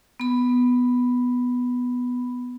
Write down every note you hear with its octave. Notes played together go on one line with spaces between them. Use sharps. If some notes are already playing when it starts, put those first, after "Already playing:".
B3 B5